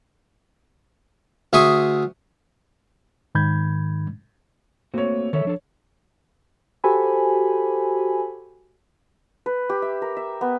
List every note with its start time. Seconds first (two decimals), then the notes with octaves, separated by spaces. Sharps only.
1.53 D2 G#4 E5 C6 C#6 D#6
3.35 G#2 D#3 B5 G6 G#6
4.94 A3 A#3 C4 F#4 C#5
5.33 D#3 A4 C#5 E5
5.45 F3 D4 A4
6.84 F#4 G4 A4 C5 G#5 B5
9.46 B4
9.70 G4
9.82 E5
10.02 A#4
10.17 E5
10.41 B3